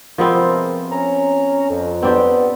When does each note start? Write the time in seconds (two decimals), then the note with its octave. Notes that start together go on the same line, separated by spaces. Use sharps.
0.18 C3 F3 G#3 B3 C4 A#4
0.91 C#4 A#5
1.70 F2
2.03 B3 C4 D4 G4